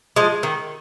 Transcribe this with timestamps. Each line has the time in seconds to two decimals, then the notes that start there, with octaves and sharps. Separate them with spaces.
0.16 F3 G#3
0.43 D#3